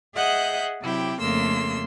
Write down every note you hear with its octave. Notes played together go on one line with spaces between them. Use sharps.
G#4 D#5 E5 F#5 F#6 G6
C3 F#3 E4 G4 G5
F2 C#3 A3 A#3 C6 E6